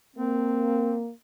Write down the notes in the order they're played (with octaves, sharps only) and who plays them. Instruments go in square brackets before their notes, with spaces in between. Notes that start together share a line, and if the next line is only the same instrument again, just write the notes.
[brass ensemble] A#3 [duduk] C4